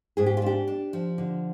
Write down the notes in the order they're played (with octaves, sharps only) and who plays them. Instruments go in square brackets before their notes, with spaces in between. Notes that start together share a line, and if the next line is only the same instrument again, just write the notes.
[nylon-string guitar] G#2 G#4
G4
F4
D4 G4
D4
F3
D3